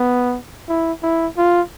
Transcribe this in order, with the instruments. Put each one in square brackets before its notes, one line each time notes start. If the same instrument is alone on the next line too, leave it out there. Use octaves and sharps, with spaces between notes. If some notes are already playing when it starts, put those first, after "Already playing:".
Already playing: [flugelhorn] B3
E4
E4
F4